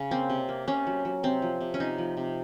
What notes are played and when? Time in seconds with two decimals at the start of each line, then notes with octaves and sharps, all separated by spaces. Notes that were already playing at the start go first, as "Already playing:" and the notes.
Already playing: C#3
0.11 A#3 C4
0.30 C3
0.49 A#3
0.68 C3 C#4
0.87 F#3
1.05 F#3
1.23 C3 C4
1.42 F3
1.61 C3
1.74 C#4
1.80 C3 D#4
1.98 F3
2.17 C3